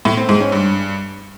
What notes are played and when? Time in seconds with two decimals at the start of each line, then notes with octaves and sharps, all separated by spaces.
0.05 A2
0.17 C4
0.29 G#2
0.41 C#4
0.52 G2